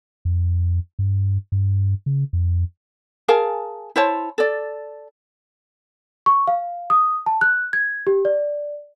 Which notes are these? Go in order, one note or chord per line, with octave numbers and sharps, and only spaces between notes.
F2
G2
G2
C#3
F2
G#4 A#4 F5 A5
E4 C5 C#5 A5
A4 D5
C#6
F5
D#6
A5
F#6
G#6
G4
D5